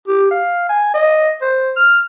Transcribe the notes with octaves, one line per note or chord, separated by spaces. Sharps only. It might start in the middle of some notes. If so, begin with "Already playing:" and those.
G4
F5
G#5
D#5
C5
F6